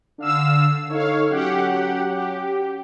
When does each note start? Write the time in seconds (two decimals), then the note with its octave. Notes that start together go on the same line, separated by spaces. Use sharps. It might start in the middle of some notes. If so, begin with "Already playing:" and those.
0.18 D3 F5 E6
0.90 D#4 A4 C#5 F5
1.31 F#3 C#4 G4 F#5
2.10 G4